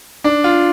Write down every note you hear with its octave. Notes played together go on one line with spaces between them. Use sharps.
D4
F4